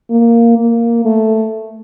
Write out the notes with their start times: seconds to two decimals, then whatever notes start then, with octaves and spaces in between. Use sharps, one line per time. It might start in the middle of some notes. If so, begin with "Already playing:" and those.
0.10 A#3
0.58 A#3
1.05 A3